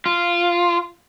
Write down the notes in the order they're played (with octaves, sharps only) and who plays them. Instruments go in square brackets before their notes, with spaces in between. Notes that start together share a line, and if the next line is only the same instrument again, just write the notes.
[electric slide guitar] F4